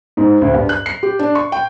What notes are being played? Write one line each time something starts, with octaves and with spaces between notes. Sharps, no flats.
G#2
D2
G2
F#6
C7
G4
D4
C#6
G5